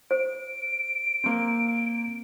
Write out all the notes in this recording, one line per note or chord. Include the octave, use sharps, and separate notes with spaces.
C5 D7
A#3 C4